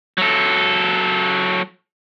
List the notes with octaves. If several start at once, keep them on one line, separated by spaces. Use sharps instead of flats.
F#3 A4